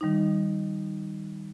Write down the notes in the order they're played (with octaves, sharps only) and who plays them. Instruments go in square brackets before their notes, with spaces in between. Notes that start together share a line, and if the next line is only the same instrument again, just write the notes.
[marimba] D#3 G3 D#4